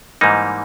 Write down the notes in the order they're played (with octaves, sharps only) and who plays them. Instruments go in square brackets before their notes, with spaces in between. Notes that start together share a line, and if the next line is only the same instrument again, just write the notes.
[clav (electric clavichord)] G#2 E3 G3 A#3 D#4